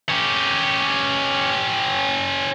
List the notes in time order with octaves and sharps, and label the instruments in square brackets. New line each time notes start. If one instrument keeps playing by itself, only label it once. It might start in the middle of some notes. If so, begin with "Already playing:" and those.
[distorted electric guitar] C#4 G4